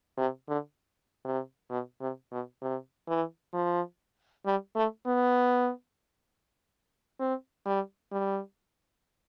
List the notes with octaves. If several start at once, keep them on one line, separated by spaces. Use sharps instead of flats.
C3
D3
C3
B2
C3
B2
C3
E3
F3
G3
A3
B3
C4
G3
G3